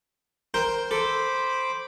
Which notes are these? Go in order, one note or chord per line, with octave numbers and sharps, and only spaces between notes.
A#4 C5 G5
A4 C5 B5 D6